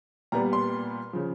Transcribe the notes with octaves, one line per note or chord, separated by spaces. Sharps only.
A#2 G3 B3 A#5
C6
C#3 F3